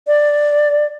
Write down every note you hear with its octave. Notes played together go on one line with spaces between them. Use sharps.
D5